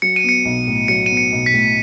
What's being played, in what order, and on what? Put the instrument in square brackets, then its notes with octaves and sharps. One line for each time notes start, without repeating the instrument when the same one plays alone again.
[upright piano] F#3 [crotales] C#7
[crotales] D#7
[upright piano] B3 [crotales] C#7
[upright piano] B1
A2
[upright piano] F#3 [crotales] C#7
[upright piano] B3 [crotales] D#7
[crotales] C#7
[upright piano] B1
[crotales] B6
[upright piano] A2